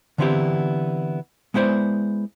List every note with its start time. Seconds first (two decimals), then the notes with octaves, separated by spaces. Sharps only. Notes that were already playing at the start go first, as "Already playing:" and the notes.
0.18 D3 E3 B3 C4 E4 G4
1.54 G#3 B3 E4 C5 D5